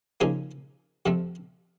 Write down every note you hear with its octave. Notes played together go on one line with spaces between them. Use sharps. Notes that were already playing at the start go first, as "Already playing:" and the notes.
C#3 F3 A#3 D#4 G#4
F2 C3 F3 A3